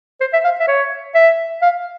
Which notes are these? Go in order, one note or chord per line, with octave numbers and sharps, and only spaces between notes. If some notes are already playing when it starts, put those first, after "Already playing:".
C5
E5
F5
E5
C#5
E5
F5